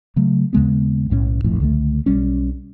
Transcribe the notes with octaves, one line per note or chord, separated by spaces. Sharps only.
C#3 F#3 A3
D#2 C#3 G#3 B3
B1 A2 G#3 C#4
D#1 A#1 F2 A2
C#2 D3 G3 A3
B1 G3 C#4